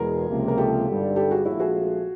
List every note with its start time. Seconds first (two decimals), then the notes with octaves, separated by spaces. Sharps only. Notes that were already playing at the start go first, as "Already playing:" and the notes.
Already playing: E2 B2 G#3 G#4 A#4
0.28 C#2 C3 F3 A#3
0.48 A#4
0.58 G4 A4
0.87 G#1 G2 D3 G3
1.16 G4 A4
1.31 F#4 G#4
1.45 A#1 G#2 F3 A3 C4 E4 F#4
1.60 F#4 G#4